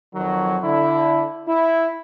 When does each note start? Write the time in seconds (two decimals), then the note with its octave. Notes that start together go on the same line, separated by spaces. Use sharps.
0.15 F2 D#3 F#3
0.64 D3 E4
1.48 E4